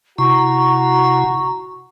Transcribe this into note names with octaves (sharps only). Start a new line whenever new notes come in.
C3 E4 F#4 A#5 C#6